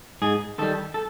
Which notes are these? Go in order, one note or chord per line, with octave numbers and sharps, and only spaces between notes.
G#2 G#4
D#3 G3 A4
A4